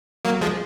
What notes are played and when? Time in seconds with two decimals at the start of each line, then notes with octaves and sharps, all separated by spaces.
0.25 F#3 A#3
0.41 F3 G#3